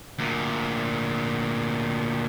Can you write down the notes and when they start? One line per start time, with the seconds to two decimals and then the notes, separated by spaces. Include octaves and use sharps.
0.19 D2 A#2